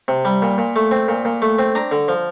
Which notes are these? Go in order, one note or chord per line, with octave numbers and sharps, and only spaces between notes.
C3
G3
A#2
A#2
A3
C4
A#2
A#2
A3
C4
D4 A#5
D3
F3